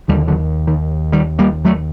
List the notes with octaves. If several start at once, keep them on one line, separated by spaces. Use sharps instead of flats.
D#2 D3 D#3 G3
D3 F#3
D#3
D#3 G3
G3 A#3
F#3 A3